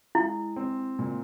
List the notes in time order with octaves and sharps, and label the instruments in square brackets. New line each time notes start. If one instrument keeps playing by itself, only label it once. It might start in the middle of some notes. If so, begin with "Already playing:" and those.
[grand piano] G#3 [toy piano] E4
[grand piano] C4
A#2